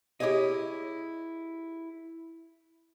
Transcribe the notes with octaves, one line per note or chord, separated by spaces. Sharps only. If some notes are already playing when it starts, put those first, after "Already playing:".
E4 G4 G#4 C#5 D#5